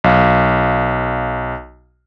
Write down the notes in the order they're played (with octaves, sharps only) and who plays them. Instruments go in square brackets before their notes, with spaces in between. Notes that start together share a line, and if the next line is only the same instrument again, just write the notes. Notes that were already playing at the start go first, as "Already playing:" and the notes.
[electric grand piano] B1 F5